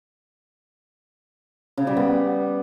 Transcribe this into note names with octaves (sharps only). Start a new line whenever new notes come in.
C#3
G3
B3